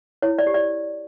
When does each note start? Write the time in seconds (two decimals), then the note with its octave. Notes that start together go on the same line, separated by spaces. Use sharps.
0.22 E4 C#5
0.39 D5
0.47 G4
0.54 D5